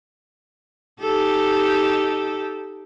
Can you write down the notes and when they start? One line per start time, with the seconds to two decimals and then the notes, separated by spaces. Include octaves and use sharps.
1.00 D#4 G4 A4